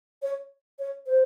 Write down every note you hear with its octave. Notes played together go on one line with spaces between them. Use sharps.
C#5
C#5
C5